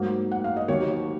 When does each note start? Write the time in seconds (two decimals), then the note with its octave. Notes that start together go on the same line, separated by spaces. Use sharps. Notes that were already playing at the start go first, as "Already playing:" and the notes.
Already playing: G#2 F#3 A#3
0.32 F#5
0.44 F5
0.56 D#5
0.68 D#2 D#3 F#3 A#3 C#5